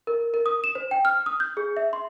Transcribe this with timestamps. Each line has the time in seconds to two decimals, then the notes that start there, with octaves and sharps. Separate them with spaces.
0.07 A#4
0.34 A#4
0.46 D#6
0.64 E7
0.75 C5
0.91 G5
1.05 F6
1.26 D#6
1.40 G6
1.57 G#4
1.77 E5
1.93 C6